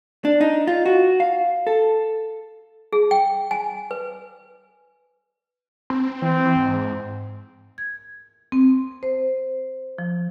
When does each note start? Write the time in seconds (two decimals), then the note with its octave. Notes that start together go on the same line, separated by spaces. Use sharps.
0.25 D4
0.41 D#4
0.67 F4
0.86 F#4
1.20 F5
1.67 A4
2.93 G#4
3.11 G5
3.51 G#5
3.91 B4
5.90 C4
6.22 E3 C4
6.56 G#2
7.78 G#6
8.52 C4
9.03 C5
9.98 F3